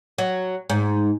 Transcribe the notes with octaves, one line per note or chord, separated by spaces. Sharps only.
F#3
G#2